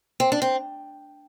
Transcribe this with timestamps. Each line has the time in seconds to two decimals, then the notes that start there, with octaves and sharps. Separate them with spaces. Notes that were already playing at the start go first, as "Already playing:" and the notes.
0.20 C4
0.32 D4
0.42 C4